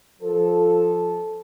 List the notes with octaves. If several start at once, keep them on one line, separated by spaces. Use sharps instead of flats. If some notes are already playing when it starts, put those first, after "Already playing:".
F3 A4